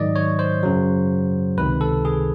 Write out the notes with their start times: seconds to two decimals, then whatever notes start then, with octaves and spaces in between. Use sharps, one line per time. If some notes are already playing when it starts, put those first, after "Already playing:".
Already playing: G#2 D#3 F#3 D5 D#5
0.16 C#5
0.39 C5
0.63 F#2 C#3 F#3
1.58 C#2 C3 D#3 B4
1.81 A4
2.05 G#4